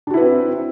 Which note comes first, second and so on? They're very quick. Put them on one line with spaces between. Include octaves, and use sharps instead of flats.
D4 F#4 E4 B4 C4